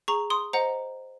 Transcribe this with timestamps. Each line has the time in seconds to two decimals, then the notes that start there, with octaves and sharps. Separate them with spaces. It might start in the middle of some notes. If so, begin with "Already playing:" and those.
0.08 G#4 A#5 C#6
0.30 C6 D#6
0.53 C5 D#5 F#5 A#5